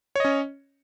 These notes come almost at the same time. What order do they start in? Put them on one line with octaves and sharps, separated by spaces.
C#5 D#5 C#4